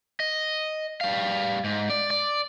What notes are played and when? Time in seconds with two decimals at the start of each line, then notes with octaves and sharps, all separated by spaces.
0.20 D#5
1.01 G3 F5
1.64 G#2
1.90 D5
2.10 D5